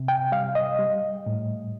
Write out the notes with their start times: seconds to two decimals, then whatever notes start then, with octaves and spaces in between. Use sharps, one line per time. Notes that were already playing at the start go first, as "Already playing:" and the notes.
Already playing: C3
0.08 G5
0.32 G3 F5
0.55 D#5
0.79 G3
1.26 A2